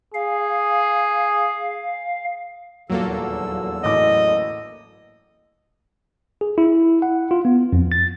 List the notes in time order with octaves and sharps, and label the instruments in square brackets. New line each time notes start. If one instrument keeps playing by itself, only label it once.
[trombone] G#4 [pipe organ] F5
[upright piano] D#1 F4 [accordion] E2 D3 E6 [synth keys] F#3 A#3 A4
[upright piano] A1 E3 D6 [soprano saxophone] D#5
[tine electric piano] G#4
E4
F#5
F4
B3
F2
A6